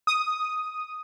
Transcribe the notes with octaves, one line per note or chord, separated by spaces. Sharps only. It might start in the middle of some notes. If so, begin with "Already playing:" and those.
D#6